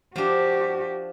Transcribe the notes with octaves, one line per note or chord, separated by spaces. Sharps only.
F3 D4 F#4 G4